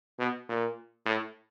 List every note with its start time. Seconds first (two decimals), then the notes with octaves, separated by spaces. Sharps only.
0.19 B2
0.49 A#2
1.06 A2